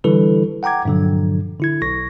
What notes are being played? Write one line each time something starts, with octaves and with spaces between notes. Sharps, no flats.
D3 E3 G3 E4 A4 B4
F#5 G5 A#5 D6 G#6
G2 A#2 D3 F3 F#3
D3 E4 G#6
B1 C#6 A#6